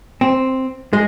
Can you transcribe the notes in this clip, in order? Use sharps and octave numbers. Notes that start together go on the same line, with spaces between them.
C4
G#3